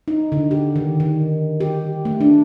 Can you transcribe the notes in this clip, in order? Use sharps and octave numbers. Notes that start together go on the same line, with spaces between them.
D#4
D3
G4
D#3
D#3
G4
A3
D4